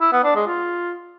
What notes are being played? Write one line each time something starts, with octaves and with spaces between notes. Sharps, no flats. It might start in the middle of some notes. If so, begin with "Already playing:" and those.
E4
B3
D4
G#3
F4